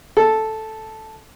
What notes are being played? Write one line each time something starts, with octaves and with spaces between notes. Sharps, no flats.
A4